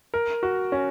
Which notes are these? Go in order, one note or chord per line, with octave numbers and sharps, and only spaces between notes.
A#4
F#4
C#4